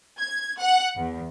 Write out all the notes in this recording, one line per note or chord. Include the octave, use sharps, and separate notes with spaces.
G#6
F#5
E2